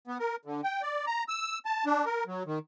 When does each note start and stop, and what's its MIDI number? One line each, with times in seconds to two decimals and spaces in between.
0.08 0.18 59
0.19 0.36 70
0.45 0.61 50
0.64 0.82 79
0.82 1.06 74
1.07 1.24 82
1.28 1.58 88
1.65 1.85 81
1.86 2.05 62
2.05 2.24 70
2.27 2.43 54
2.46 2.59 51